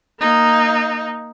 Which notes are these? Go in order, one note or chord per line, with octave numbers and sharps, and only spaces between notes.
A#3 D#4